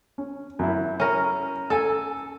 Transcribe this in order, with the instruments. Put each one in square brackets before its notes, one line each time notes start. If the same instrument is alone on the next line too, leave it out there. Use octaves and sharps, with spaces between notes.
[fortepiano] C#4
F#2 E4
[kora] C#4 A#4
[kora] A4 [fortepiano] G#5 E6